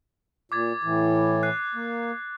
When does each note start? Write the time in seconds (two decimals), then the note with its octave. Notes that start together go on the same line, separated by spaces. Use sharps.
0.52 A#2 D6 G#6 A6
0.84 A2 E3
1.43 F#6 C7
1.75 A#3